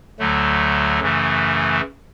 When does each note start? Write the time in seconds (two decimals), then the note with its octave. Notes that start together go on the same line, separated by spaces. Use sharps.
0.19 D2 D3 F#3 A3
1.00 F#2 C#3 E3 A3